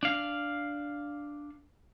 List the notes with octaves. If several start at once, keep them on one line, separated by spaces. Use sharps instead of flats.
D4 F5